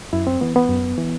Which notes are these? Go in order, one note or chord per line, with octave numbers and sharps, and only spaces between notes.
F#2 E4
C4
E3 B3
B3
F#2
E3